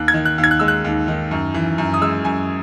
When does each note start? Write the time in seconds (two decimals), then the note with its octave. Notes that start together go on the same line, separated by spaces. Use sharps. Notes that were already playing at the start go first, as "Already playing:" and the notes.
Already playing: D#2 F#6
0.08 G#6
0.14 D#3
0.25 F#6
0.38 D#2
0.44 G#6
0.51 F#6
0.59 G#3 E6
0.68 F#6
0.84 D#2
1.08 D#3
1.31 F#2
1.54 E3
1.78 F#2
1.94 D#6
2.01 G#3 E6
2.25 F#2 G#5